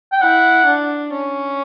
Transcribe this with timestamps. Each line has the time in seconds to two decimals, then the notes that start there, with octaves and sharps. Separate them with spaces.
0.12 G5
0.21 E4 F#5
0.66 D4
1.12 C#4